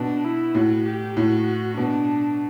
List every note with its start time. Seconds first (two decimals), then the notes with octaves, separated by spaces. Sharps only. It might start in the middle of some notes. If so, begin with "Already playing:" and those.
Already playing: B2 D4
0.25 E4
0.55 A2 F#4
0.86 G4
1.17 A2 F#4
1.77 B2 D4